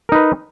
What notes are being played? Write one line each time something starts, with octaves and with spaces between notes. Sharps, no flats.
D#4 A#4 B4